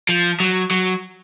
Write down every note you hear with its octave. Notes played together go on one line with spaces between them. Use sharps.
F3
F#3
F#3